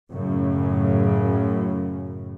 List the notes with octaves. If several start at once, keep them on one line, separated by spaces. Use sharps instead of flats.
F#2 A2 C#3